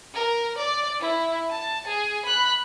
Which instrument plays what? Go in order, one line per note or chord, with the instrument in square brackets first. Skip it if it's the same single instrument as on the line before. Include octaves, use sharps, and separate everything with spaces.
[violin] A#4
D5
E4
A5
G#4
B5 F#6